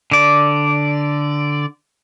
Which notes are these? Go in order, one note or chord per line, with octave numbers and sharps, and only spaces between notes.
D3 D5